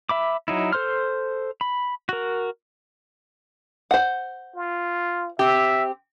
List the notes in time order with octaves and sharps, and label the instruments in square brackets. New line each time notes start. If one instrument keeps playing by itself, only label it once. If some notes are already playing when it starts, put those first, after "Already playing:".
[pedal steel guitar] E5 B5 D6
F#3 D#4 E4
A4 C5 C6 F6
B5
F#4 A#4
[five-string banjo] C5 F#5
[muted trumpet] F4
[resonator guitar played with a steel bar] C4 G4 [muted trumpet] E5